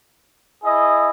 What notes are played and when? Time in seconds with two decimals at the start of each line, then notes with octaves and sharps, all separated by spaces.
0.63 E4 G#4 D#5